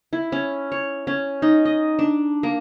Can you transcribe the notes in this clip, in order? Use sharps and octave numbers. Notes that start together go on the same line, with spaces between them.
E4
C#4
C#5
C#4
D#4
D#5
D4
A#3